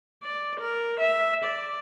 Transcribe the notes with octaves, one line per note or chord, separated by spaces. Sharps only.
D5
A#4
E5
D5